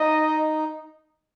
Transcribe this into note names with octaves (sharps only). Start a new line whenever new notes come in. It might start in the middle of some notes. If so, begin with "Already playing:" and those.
Already playing: D#4 D#5